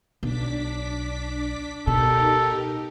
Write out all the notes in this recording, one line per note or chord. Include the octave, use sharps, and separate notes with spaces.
B1 D4 D6 B6
B2 D#4 G4 A4 A#4